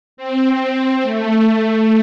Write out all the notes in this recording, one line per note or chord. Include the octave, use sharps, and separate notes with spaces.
C4
A3